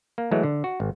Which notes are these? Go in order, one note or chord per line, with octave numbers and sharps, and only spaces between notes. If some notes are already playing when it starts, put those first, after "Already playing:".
A#3
E3 F#3 G#3 A3
D3
F#4
G#1